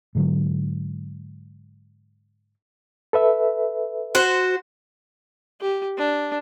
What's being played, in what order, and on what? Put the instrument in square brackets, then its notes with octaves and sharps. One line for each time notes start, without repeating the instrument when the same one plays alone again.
[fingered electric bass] G#2 D3 F#3
[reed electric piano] A4 B4 E5
[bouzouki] F#4 C5
[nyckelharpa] G4
D4